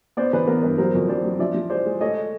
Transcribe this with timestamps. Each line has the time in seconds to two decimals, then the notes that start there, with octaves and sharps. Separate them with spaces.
0.17 B3 C5 D5
0.33 E3 B4
0.47 B3 A#4
0.63 G2 B4
0.78 F#3 A#4 C5
0.94 F2
1.08 F#3 C5 D5
1.24 F#3
1.39 F3 D5 E5
1.54 F3
1.70 G#3 C5 D5
1.85 G#3
2.01 A3 C#5 D#5